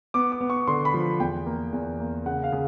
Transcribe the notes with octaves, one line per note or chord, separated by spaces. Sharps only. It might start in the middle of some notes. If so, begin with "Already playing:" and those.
B3 D6
D6
B3
C#6
D3 C6
B5
F3
E2 G5
A#3
E2
A#3
C#3 F#5
F5
C#3